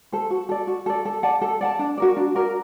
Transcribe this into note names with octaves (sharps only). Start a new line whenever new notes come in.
A4 C5
F#4
A4 D5
F#4
A4 D5
A4
D5 F#5 A5
A4
D5 F#5 A5
D4
F#4 A#4 D5
D4
F#4 A#4 D5